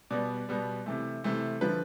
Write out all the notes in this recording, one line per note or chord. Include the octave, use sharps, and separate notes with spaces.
B2 G3 B3 D5
B2 G3 B3
C3 E3 A3
C3 E3 A3
D3 F3 B4